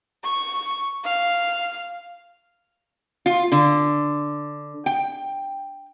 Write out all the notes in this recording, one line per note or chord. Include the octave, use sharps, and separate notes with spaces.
C#6
F5
F4
D3
G5